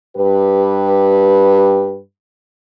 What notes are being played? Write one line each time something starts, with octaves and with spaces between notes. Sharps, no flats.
G2 G4 B4